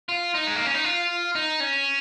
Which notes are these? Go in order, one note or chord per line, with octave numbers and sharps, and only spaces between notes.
F4
D#4
G#3
A#3
C#4
D#4
F4
D#4
C#4